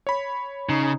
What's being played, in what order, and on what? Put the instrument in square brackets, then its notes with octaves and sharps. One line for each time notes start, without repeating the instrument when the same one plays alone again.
[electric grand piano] C#5 B5
[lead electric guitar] C#3 [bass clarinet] D#4